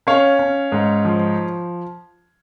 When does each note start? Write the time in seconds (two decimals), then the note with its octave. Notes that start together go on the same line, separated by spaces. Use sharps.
0.07 C#4 C#5 F5
0.39 C#4
0.72 G#2
1.05 F3